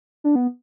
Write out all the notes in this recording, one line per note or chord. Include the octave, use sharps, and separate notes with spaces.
D4
B3